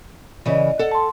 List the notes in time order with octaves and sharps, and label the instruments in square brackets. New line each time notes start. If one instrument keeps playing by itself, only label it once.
[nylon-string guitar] C#3 E3 [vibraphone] D5 D#5
[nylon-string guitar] A4 F#5
[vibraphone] A5 C6